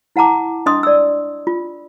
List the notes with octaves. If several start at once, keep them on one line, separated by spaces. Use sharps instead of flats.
E4 F#5 A5 A#5 D6
D4 D#5 C6 D#6
D5 E6
F4